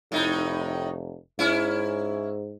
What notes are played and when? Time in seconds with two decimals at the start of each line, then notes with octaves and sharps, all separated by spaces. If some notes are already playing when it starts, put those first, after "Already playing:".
0.12 F1 A2 D#4
1.39 G#2 C#4 E4